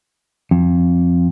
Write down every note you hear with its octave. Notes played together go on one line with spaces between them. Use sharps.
F2